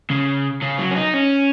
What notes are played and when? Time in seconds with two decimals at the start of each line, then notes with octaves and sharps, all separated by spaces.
0.10 C#3
0.62 C#3
0.79 F#3
0.91 C#4
0.96 D#4
1.14 C#4